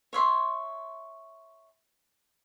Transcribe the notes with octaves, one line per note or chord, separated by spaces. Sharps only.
C#5 E5 C6